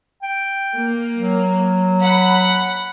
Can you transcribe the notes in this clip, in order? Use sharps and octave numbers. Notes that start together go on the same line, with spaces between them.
G5
A#3
F#3
F#5 B5